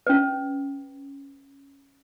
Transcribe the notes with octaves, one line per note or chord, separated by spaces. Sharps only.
C#4 B4